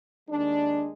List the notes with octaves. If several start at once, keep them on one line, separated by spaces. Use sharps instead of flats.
D#2 D#3 G#3 D4